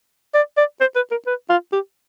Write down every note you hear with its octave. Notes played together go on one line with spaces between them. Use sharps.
D5
D5
C5
B4
A#4
B4
F4
G4